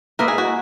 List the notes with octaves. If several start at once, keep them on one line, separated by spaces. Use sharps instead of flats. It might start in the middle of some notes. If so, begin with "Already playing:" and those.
A#3 E4 A#4 B4 D#5
G#4
F#4